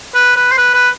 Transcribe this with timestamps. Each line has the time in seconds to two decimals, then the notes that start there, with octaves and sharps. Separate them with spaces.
0.15 B4
0.36 B4
0.52 C5
0.58 B4
0.74 B4